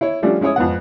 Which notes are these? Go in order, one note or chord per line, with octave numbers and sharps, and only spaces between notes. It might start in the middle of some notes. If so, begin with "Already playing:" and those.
E4 C#5
F3 G3 A3 C#4 D4
G#3 C#4 E4 C#5 D#6
F2 G#2 B3 F#5